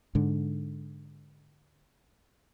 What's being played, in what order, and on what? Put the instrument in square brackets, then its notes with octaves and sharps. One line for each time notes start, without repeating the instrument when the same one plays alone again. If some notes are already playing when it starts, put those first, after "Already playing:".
[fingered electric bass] G#2 D3